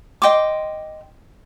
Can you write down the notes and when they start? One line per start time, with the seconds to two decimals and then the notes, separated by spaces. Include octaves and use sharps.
0.22 D#5 G5 C6 D6